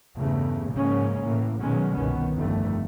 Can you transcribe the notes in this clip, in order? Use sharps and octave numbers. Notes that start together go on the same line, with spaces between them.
E2 G2 C#3 A3
G#2 C#3 F3 A#3 C#4
A2 E3 A#3
B2 D#3 F#3 G#3 B3 C#4
G1 C2 B2 D#3 B3 C#4
G1 F2 D3 D#3 A3